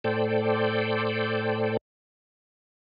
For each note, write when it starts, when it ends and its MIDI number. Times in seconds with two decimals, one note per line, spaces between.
0.04 1.77 45
0.04 1.77 69
0.04 1.77 72
0.04 1.77 74
0.04 1.77 79